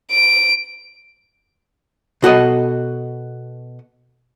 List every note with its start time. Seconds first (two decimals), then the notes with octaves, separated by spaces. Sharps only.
0.11 D7
2.23 B2 F#4 A4 D#5